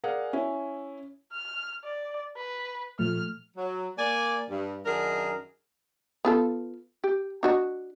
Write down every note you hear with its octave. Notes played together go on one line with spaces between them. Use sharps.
G#4 A#4 D5 F5 F#5 G#5
C#4 E4
F6
D5
B4
A#2 F3 A3 F6
F#3
A#3 D5 G#5
G2
F#2 D#3 D4 G#4 A#4
B3 F4 A4
G4
D4 F#4 D#5